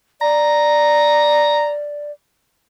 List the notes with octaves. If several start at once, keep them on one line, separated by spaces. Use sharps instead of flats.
D5 A#5